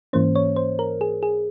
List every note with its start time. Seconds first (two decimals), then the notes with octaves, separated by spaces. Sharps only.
0.13 G#2 E3 A#3 C#4 C5
0.35 C#5
0.56 C5
0.79 A#4
1.01 G#4
1.23 G#4